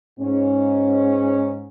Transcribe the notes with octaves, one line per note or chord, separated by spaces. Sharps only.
G#2 C#4